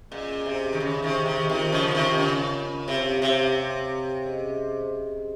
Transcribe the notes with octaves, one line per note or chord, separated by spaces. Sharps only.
A#2 C#4 G#4 D#5
C3
D#3
C#3
C3 D#3
C3 D#3
C3 D#3 F4 A#4 D#5
C#3 F3
C#3
C3 D#3
C#3
C3 C4 G4 C#5 F5
C3
C#4 G#4 D#5